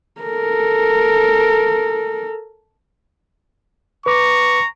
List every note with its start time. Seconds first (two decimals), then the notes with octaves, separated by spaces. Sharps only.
0.21 A4 A#4
4.06 B4 A#5 C#6 D6